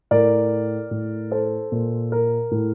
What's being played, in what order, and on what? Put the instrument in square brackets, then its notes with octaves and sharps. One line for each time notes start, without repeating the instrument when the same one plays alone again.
[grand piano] A2 A#4 D5
A2
A4 C5
A#2
A#4
A2